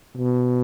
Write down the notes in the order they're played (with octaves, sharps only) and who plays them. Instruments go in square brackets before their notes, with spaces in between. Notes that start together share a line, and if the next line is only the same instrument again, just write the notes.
[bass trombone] B2